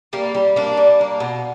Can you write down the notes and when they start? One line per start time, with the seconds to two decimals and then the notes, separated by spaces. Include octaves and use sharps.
0.13 G3 A#3
0.35 G3
0.56 A#3 D4
0.77 G3
0.99 A#3 D4
1.20 B2